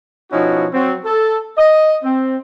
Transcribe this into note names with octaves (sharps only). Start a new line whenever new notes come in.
B2 F3 C#4 D#4 E4 F#4
F#3 C4
A4
D#5
C4